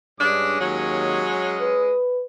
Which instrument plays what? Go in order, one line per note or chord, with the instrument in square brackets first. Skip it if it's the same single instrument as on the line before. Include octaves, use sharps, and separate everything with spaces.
[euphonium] G2 [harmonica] G#3 C#4 D#6 [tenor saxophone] D4
[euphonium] D#2 [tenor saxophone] F#3
[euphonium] B4